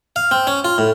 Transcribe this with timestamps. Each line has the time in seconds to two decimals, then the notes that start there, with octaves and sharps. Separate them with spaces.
0.16 F5
0.31 C4
0.47 C#4
0.65 F4
0.78 A2